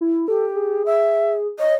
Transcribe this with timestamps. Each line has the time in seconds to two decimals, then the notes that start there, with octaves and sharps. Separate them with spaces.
0.01 E4
0.28 G4 A4
0.55 G#4
0.86 E5
1.59 C#5 D#5